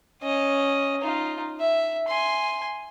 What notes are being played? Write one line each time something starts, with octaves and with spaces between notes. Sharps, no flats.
C#4 D#5
D#4 F4
E5
G#5 C6